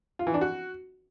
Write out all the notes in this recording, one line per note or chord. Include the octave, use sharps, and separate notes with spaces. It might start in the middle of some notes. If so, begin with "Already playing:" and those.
F4
E3
D4
F#4